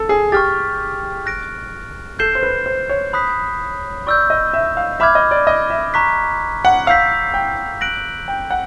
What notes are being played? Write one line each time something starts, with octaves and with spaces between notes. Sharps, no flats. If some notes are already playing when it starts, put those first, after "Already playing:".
Already playing: A4
G#4
G4 C#6 F6 A6
F#6 A#6 D7
A4 G6 C7 E7 G7
C5
B4
C5
C#5
B5 D#6 F#6 B6
D5 C#6 E6 G6
D#5
E5
F5
E5 B5 D6 F6 G#6
D#5
D5
D#5
E5
A#5 C#6 F#6 B6
F#5
F5 E6 G6 B6
G5
F#6 A#6 D7 F#7
G5
F#5